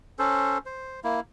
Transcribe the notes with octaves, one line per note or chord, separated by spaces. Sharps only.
C#4 A4 C5
C5
A#3 E4